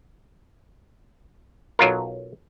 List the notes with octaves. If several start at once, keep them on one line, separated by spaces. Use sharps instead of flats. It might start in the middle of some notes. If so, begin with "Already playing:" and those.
B1 F#3 F4 A#4